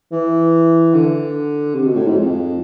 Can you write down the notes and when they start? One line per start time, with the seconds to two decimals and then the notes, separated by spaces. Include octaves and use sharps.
0.12 E3
0.94 D3
1.75 C3
1.86 B2
1.96 A2
2.07 G#2
2.16 F2